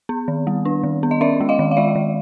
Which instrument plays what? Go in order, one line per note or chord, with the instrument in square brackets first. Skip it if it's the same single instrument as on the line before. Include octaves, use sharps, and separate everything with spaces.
[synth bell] B3
D#3
G3
D4
D#3
B3
D#5
C#4 D5 E5
G#3
D#5 F5
D#3
F5
G#3 D5 E5
D#3